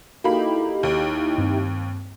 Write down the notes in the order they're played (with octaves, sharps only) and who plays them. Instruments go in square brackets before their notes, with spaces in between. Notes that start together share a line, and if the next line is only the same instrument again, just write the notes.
[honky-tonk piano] A#3 B5 [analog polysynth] D#4 E4 G4 [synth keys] F#4 A4 F5
[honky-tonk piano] D#2
[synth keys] G2 C4